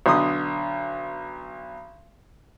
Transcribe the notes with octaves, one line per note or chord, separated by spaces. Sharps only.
B1 D3 C6 D#6